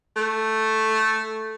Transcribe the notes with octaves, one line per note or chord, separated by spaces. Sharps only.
A3